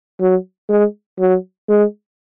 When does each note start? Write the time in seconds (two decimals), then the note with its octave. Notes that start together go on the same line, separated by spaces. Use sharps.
0.21 F#3
0.69 G#3
1.19 F#3
1.69 G#3